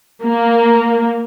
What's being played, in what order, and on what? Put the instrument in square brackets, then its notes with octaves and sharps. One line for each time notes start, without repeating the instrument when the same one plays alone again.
[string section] A#3